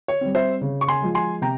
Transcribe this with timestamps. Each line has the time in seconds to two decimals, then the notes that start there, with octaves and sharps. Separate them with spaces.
0.08 C#5
0.21 G3 C4
0.35 C5 E5
0.61 C#3
0.81 C#6
0.88 G#5 C6
1.02 F3 G#3
1.15 G#5 C6
1.42 C3 G5 A#5